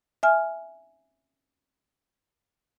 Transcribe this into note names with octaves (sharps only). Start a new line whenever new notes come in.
E5 G#5 F6